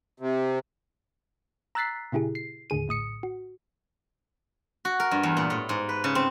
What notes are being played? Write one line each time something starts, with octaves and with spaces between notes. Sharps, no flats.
C3
A#5 E6 F#6 A6 B6 C7
A#2 C#3 E4 G4 G#4
C7
D#2 A2 D3 G#4 D#7
A#1 A2 D#6 C#7
F#4
F#4
A#4
G2
E2
A#2
A2
G#2
B4
C#3
C4